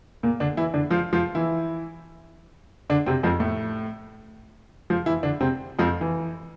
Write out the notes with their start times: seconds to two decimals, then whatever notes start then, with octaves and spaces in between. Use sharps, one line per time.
0.23 A#2 A#3
0.40 D3 D4
0.57 E3 E4
0.74 D3 D4
0.90 F3 F4
1.13 F3 F4
1.35 E3 E4
2.90 D3 D4
3.06 C3 C4
3.23 F2 F3
3.40 A2 A3
4.90 F3 F4
5.06 E3 E4
5.23 D3 D4
5.40 C3 C4
5.79 F2 F3
6.01 E3